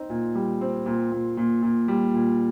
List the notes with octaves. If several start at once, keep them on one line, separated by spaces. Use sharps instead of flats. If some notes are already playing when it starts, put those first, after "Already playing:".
Already playing: C4 D#4
A#2
G3
C4
A#2
A#2
A#2
A#2
G3
A#2